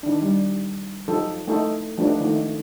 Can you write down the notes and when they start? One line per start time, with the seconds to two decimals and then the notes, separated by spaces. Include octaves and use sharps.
0.03 D#3 D4
0.22 G3
1.08 F3 F#3 D#4 A4
1.47 A3 D#4 A4
1.98 F3 A3 D4 D#4 B4
2.21 D#3 A3